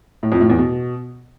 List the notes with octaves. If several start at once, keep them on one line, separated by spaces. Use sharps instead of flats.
A2
F2
A2
E2
B2